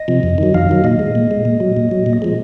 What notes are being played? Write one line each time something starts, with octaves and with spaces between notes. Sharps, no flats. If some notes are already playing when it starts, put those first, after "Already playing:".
Already playing: D#5
C3 F3
F2
D#3 F#3
F2 F5
D#3 F#3
A#2 D#5
G#3
A#2
G#3
A#2
F#3
A#2
F#3
A#2
F3 G#3